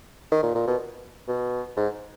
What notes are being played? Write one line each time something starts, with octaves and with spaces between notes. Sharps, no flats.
D#3
A#2
A#2
B2
B2
G#2